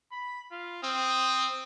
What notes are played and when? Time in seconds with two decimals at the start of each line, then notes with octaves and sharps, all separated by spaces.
0.12 B5
0.52 F4
0.83 C4 D#6